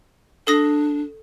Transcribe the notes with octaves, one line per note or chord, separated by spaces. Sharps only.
D4 A4 D#6 A#6